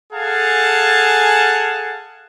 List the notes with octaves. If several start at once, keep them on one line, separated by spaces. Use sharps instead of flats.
G#4 A4 F5 F#5 G#5 A5